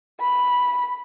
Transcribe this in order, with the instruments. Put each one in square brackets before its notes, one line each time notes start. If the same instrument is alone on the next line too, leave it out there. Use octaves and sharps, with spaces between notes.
[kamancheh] B5